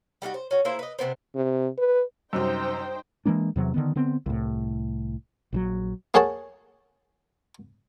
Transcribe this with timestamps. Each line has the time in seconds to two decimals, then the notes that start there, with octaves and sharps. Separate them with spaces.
0.22 G3 A3 D#4 F#4
0.34 C5
0.51 C#4 F#4
0.65 A#3 E4 G#4 C5
0.79 B4 D#5
0.99 C3 D#3 B3 C4
1.35 C3
1.78 B4
2.33 F#2 C3 G3 D#4 F#4 C5 G5 A#5
3.26 E3 G#3 A#3 D4
3.56 E2 C3 F#3
3.74 D3 D#3 B3
3.96 D3 B3 C4
4.26 C2 A2
5.53 A#1 C#3 F#3
6.14 A#3 G#4 C#5 F#5 A5